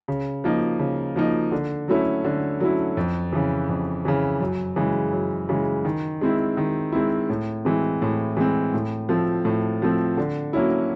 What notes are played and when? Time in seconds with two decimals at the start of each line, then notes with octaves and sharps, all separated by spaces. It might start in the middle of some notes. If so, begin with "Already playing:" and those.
0.08 C#3
0.44 F3 A#3 D#4
0.79 C#3
1.16 F3 A#3 D#4
1.52 D3
1.88 F#3 A3 C#4 E4
2.24 D3
2.60 F#3 A3 C#4 E4
2.97 F2
3.32 C#3 E3
3.69 F2
4.05 C#3 E3
4.41 F#2
4.76 C#3 E3 G#3
5.12 F#2
5.49 C#3 E3 G#3
5.85 D#3
6.21 G#3 C4 E4
6.57 D#3
6.92 G#3 C4 E4
7.29 A2
7.65 E3 G#3 C4
8.02 A2
8.37 E3 G#3 C4
8.74 A2
9.09 F3 A3 C4
9.45 A2
9.82 F3 A3 C4
10.17 D3
10.53 F#3 A#3 C#4 E4